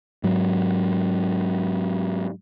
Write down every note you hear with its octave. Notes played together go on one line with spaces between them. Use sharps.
G#2 F#3